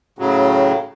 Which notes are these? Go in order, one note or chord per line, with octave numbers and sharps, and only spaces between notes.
A2 C#3 F#3